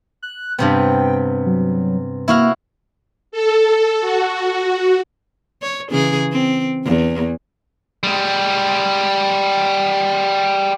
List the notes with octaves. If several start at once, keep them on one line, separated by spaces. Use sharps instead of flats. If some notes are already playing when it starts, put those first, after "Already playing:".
F#6
G2 C3 B3 G5
F#3
A#3 E4 F#4 F5
A4
F#4
C#5
C#3 E3 G#4
C4
E2
G3 G#3